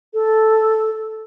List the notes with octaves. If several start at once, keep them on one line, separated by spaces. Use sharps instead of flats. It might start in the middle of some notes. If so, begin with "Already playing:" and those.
A4